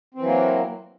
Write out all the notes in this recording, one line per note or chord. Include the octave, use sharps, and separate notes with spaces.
E3 F#3 A#3 C4